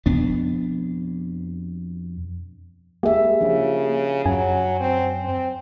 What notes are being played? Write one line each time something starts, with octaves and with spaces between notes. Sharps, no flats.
F2 B2 B3 D4
G#3 A#3 G4 G#4 E5
C#3 F3 D4
F#2 F#3 G#5
C4
C4